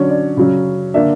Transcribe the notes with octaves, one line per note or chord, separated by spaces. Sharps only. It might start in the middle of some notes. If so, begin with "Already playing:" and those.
Already playing: D3 F#3 C#4 C#5
D5
C#3 F#3 C#4
D3 A#3 D4 E5